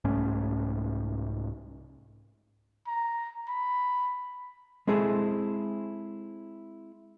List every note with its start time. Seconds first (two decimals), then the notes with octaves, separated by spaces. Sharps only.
0.04 C2 G#2 A3 C#4
2.87 A#5
3.49 B5
4.87 G#3 C4 E4 G#4 A4